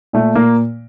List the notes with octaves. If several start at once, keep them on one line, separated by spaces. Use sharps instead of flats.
A#2 A3
A#2 A#3